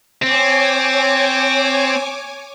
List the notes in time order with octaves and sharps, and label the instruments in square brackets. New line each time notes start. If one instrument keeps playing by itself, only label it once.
[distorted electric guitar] C4 [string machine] C#5 G#5 D6